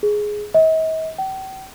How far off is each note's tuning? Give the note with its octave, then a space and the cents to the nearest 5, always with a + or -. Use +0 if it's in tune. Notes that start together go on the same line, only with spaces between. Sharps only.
G#4 +5
D#5 +45
G5 -40